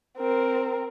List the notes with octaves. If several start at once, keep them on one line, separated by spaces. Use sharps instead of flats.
C4 A#4